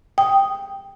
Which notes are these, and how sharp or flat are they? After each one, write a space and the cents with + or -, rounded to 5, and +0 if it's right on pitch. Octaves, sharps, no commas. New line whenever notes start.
G5 +0 D#6 +0